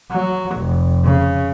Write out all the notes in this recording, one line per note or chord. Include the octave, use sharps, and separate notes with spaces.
F#3
F1
C#3